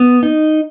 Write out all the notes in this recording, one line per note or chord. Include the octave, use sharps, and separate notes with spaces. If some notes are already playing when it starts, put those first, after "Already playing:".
Already playing: B3
D#4